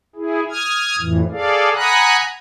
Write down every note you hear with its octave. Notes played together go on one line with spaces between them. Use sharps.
E4 G#4
D#6 F6 G#6
F2 A2 E3
G#4 A4 D5 F5
F#5 G#5 A#5 B5 D#6 F#6